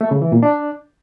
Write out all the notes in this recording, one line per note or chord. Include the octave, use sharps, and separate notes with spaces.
A3
C#3
E3
A#2
D4